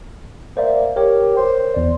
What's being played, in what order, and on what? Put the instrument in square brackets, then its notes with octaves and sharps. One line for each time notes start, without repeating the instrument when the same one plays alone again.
[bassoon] A#3 [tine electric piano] C5 D5 E5
[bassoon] G4 [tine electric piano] A#4 C#5
[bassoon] C5
[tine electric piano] E2 D5